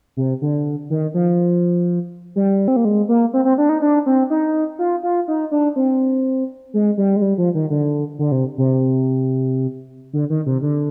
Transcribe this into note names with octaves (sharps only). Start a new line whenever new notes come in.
C3
D3
D#3
F3
G3
C4
A#3
G#3
A#3
C4
C4
D4
D#4
D4
C4
D#4
F4
F4
D#4
D4
C4
G#3
G3
G#3
G3
F3
D#3
D3
D3
C3
C3
D3
D#3
C3
D3